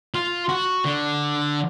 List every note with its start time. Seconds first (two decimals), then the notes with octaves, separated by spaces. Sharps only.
0.15 F4
0.49 F#4
0.85 D3